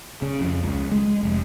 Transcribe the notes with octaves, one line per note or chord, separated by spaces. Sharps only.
C#3
F2
C#2
G#3
F1